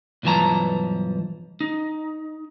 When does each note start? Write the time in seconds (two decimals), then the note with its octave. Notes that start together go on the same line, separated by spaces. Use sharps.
0.23 B1 G2 E3 F3 A5 A#5
1.61 D#4